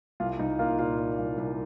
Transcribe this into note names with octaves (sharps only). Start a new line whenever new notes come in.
C2 F4
C2 D#4
A#3 F4
A#2 F4
A#3
C2
C2